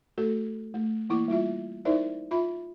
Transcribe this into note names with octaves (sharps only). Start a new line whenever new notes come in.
A3 F#4 A4
A3
E3 A#3 E4 D6
G3 E4 F4 E5
D#4 E4 A#4 C5 D5 E5
F4 E5 B5